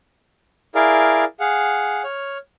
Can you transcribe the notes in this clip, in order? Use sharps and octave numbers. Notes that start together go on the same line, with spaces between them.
E4 G#4 A#4 D5 F5
G#4 F5 F#5
C#5 F6